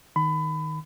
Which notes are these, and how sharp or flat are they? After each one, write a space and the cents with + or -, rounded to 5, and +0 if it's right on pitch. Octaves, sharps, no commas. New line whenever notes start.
D#3 +0 B5 +25